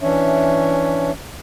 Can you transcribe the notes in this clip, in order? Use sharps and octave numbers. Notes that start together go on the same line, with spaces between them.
E3 C#4 D4 C#5 E5